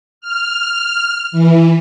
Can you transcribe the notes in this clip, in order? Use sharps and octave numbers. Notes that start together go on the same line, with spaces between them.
F6
E3